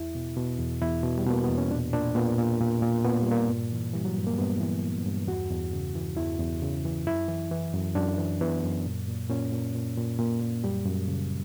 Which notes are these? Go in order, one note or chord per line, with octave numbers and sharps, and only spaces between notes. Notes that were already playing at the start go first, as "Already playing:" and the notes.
Already playing: E2 E4
B2
B2
E2
E2 E4
B2
G3
B2 A#3
E2 B3
C#4
A#2 D4
A#2 D4
A#2 B3
A#2
A#2
A#2
A#2 B3
A#3
G3
A#2
A#3
G2
E3
E3 G3
F#3
G2
A#3
G2 B3
E3
E3
G2
E2 F#4
E2
C#3
E3
E2 E4
E2
C#3
E3
F#2 E4
E3
E3
F#2
F#2 D4
E3
E3 B3
F#2
A#2
A#2
A#2 C#4
A#2
A#2
A#2
A#2 A#3
A#2
F#2 G3
F#2
C#3